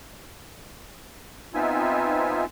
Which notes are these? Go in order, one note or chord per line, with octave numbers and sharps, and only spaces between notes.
B3 C4 D#4 F4 E5 G#5